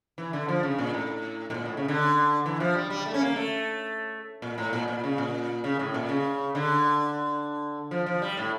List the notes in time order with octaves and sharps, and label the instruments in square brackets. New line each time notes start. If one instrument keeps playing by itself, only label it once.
[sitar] E3
D3
F3
C#3
A#2
A2
A2
A#2
A2
C#3
D3
E3
F3
G3
G3
A3
C#4
A#3
A3
A#2
A2
A#2
A#2
C#3
A#2
C#3
A2
A#2
C#3
D3
F3
F3
G3
A2